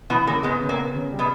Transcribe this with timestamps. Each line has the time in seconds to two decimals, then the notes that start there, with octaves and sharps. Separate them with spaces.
0.10 B2 E3 B3
0.26 A#2 C#3 A#3
0.43 G#2 G#3 B3
0.61 C#3
0.69 A#2 A#3
0.77 B3
0.95 C#3
1.12 G3
1.19 B2 B3